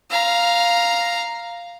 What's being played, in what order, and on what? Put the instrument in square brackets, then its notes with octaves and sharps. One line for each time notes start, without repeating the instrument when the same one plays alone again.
[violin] F5 A#5